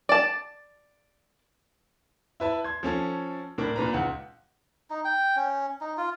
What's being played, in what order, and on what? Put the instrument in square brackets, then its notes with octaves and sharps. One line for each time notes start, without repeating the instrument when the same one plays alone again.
[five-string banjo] D5 A5
[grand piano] E4 B4 A5
C6 G#6
F3 C#4 A4
A2 D4 A#4
A#2 D4 B4 A#5
C#2 F#5
[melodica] D#4
G5
C#4
D#4
F4